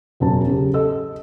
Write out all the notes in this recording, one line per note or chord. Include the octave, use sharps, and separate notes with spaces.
E1 F#2 A5
C#3 G4
A4 D#5 E6